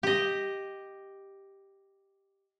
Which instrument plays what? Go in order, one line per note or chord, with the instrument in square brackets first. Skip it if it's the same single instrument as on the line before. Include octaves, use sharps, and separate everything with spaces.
[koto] G4 D#5